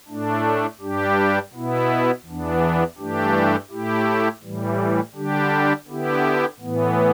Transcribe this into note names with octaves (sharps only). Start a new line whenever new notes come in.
A2 A3 D4
G2 G3 D4 G4
B2 B3 E4
E2 E3 B3 D4
G2 E3 A3 D4 G4
A2 A3 E4 G4
A2 E3 G3
D3 G3 D4 G4
D3 B3 E4 G4
A2 E3 B3